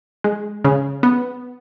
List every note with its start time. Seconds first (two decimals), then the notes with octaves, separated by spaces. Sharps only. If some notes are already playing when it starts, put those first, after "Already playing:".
0.24 G#3
0.64 C#3
1.03 B3